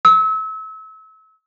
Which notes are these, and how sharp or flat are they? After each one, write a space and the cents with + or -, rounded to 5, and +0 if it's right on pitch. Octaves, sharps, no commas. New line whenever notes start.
E6 -35